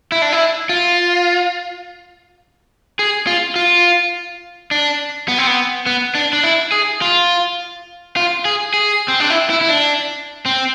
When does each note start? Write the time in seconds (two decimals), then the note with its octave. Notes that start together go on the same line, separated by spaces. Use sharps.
0.12 E4
0.22 D4
0.32 E4
0.69 F4
2.99 G#4
3.27 F4
3.56 F4
4.71 D4
5.28 B3
5.38 C4
5.47 B3
5.86 B3
6.15 D4
6.33 D4
6.44 E4
6.72 G#4
7.02 F4
8.16 F4
8.45 G#4
8.74 G#4
9.08 C4
9.20 D4
9.30 E4
9.50 E4
9.61 E4
9.69 D4
10.46 C4